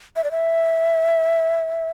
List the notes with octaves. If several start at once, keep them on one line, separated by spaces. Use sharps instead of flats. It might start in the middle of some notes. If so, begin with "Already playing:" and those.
E5
D5
E5